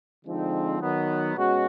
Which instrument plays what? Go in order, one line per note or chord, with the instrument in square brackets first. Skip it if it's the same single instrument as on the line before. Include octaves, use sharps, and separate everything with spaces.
[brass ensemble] D3 F3 G#3 C4 D#4
D#3 F#3 B3
B2 G#3 C#4 F#4